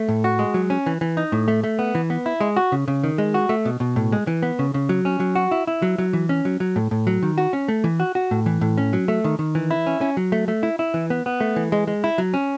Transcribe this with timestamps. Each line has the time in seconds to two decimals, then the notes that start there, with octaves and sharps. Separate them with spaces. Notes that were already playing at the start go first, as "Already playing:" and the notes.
Already playing: A3
0.09 A2
0.24 F#4
0.39 G#3
0.54 F#3
0.70 C#4
0.86 E3
1.01 E3
1.17 D#4
1.32 A2
1.48 A3
1.64 A3
1.79 B3
1.95 E3
2.10 B3
2.26 E4
2.40 G#3
2.56 F#4
2.72 C#3
2.88 C#3
3.04 D#3
3.18 G#3
3.34 F#4
3.49 A3
3.65 B2
3.80 B2
3.96 A2
4.12 G#3
4.27 E3
4.42 B3
4.59 C#3
4.74 C#3
4.89 F#3
5.05 C#4
5.20 F#3
5.35 F#4
5.51 E4
5.67 E4
5.82 F#3
5.98 F#3
6.13 E3
6.29 C#4
6.45 F#3
6.60 F#3
6.76 A2
6.91 A2
7.07 F#3
7.23 D#3
7.38 F#4
7.53 C#4
7.68 A3
7.84 E3
8.00 F#4
8.15 F#4
8.31 A2
8.46 E3
8.61 A2
8.77 C#4
8.93 F#3
9.08 A3
9.24 D#3
9.39 D#3
9.55 E3
9.71 E4
9.87 C#4
10.01 C#4
10.17 F#3
10.32 A3
10.48 A3
10.63 E4
10.79 E4
10.94 E3
11.10 B3
11.26 B3
11.40 A3
11.56 E3
11.72 G#3
11.87 G#3
12.04 E4
12.18 F#3
12.34 C#4